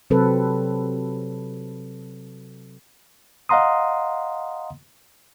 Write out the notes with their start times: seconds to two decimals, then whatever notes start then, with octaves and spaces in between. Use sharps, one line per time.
0.10 C3 F#3 C4 A4 B4
3.49 D#5 F5 F#5 A#5 C6 D#6